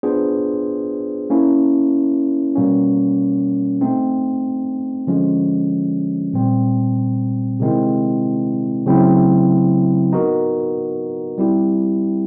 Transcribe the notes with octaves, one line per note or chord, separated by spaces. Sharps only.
B3 D4 F4 G#4 C5
A#3 C#4 E4
B2 G3 A#3 C#4
A3 C4 D#4
D3 F3 G#3 C#4
A#2 G3 C4
C3 D#3 G#3 C4 E4
C#3 F#3 A3 C4 E4
B3 D#4 F#4 A#4
G3 C4 E4 G4